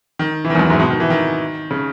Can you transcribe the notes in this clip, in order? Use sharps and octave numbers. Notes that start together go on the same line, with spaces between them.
D#3
E3
D#3
E2
F#2
G#2
B2
D#3
E3
D#3
C#3